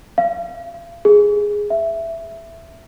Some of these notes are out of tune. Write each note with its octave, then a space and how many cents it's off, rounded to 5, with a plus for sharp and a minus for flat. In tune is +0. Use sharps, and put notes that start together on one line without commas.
F5 -40
G#4 -5
E5 +10